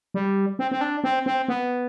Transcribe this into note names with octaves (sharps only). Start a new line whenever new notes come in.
G3
C4
C4
D4
C4
C4
B3